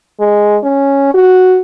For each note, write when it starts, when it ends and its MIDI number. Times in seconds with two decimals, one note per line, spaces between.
0.20 0.57 56
0.63 1.14 61
1.14 1.62 66